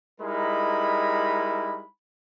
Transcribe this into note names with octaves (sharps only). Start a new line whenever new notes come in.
G3 G#3 D#4 E4 A#4 B5